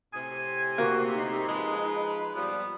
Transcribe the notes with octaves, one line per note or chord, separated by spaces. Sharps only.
A2 C3 G#5
A#3 F#4
D#4
F3 G#3 B4
A#2 F3 G3 B3